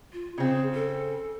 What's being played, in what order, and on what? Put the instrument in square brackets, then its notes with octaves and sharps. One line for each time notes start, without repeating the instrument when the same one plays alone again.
[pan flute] F4
[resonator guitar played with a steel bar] C#3 C4 [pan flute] G#4
[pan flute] A4